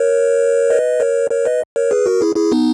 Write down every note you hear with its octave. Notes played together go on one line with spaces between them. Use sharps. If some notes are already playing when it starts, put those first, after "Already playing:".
Already playing: A#4 C#5
B4 D#5
A#4 C#5
A#4 C#5
B4 D#5
A#4 C#5
G#4 B4
F#4 A#4
E4 G#4
E4 G#4
B3 D#4